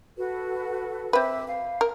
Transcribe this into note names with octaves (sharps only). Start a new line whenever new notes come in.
F#4 A4 B4
C4 B4 E5 D6
F5
A#4